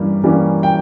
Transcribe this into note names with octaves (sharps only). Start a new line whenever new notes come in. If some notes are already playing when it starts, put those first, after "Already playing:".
Already playing: G2 E3 G3 A#3 C#4
E3 G3 A#3 C#4
G5